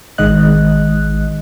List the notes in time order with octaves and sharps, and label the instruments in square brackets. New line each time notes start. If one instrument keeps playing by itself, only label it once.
[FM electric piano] A1 D#3 G#3 D#5 F#6